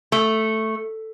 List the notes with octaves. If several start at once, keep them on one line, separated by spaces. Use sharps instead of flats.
A3